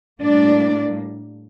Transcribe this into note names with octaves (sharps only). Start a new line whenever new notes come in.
A2 G3 A#3 D4 D5